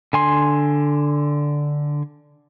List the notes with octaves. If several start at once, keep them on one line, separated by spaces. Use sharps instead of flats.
D3 G#5 C6